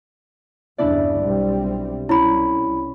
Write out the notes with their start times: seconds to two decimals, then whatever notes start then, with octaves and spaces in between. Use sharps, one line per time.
0.78 E2 G2 C#3 D4 E4 D5
1.20 B1 G3 C4
2.09 C2 C#4 E4 B5